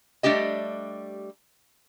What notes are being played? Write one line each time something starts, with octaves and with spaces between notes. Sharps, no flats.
G3 A3 D4 G4 D#5